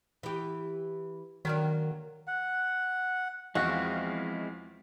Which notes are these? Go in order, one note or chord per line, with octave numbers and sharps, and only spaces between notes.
E3 G4
D#3 F#3 A#3 D4
F#5
E2 F3 G#3 C4 E4 F#4 D#5 F5